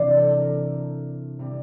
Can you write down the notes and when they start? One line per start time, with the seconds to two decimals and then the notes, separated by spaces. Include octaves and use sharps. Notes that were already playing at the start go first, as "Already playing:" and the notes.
Already playing: C3 E3 D4 C5 D5
0.16 A4
0.30 A4
0.40 A#4
1.39 C3 E3 G3 C4